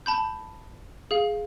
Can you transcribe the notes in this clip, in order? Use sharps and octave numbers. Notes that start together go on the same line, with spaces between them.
A5 B5 G6
G#4 F5